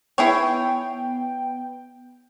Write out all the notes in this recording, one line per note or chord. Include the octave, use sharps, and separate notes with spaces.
B3 E4 G#4 C#5 G5